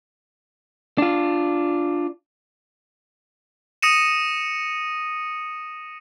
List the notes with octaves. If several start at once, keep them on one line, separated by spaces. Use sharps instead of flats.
D4 F4
D#6 A#6 C#7 D#7 E7